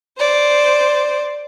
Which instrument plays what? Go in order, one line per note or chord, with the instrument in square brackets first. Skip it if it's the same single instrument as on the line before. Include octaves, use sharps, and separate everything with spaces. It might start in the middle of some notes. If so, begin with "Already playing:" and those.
[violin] C5 D5